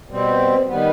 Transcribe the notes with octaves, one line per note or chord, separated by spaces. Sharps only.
B2 G3 C4
D#3 G3 B3